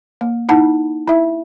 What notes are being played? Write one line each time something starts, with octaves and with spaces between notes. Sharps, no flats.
A#3
D#4 E4 F#5 A5
E4 E5